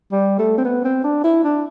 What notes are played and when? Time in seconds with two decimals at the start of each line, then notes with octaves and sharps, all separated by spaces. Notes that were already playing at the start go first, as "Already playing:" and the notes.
0.12 G3
0.39 A3
0.58 C4
0.65 B3
0.85 C4
1.04 D4
1.24 E4
1.44 D4